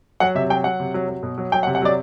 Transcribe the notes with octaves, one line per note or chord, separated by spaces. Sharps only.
F#3 F#5
C3 E5
F#3 G5
F#3 F#5
C3
F#3
F#3
B2
F#3
F#3 G5
F#5
C3
F#5
F#3 D5